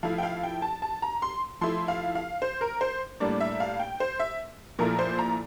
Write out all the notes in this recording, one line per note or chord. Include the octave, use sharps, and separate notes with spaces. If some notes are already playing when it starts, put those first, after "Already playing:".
F3 A3 E4 F5
G5
F5
G5
A5
A5
A#5
C6
F3 A3 E4 C6
F5
F5
C5
A#4
C5
A2 G3 A#3 D4 D5
E5
F5
G5
C5
E5
A#2 F3 A3 E4 A#4
C5
A#5